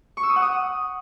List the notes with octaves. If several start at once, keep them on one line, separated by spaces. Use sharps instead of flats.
C#6
E6
D#6
F#5
D#6